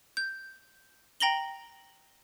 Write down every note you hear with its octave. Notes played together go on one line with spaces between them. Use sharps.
G6
G5 A#5 A#6 F#7 G7